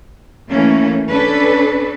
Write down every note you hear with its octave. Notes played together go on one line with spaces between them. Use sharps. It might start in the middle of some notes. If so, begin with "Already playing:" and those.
E3 A3 A#3 C#4
C#4 D4 A4 B4